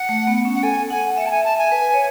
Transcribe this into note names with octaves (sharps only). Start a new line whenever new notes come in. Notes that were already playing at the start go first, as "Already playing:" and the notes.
Already playing: F#5
A3
B3
C#4
F#5
A4 G#5
F#5 G#5
E5 F#5
A5
G#5
A5
G#5
B4
C#5